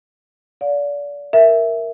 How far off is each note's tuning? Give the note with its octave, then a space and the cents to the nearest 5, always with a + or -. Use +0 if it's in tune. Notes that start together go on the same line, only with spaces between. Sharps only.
D5 -30 F5 +40
A#4 +0 E5 +0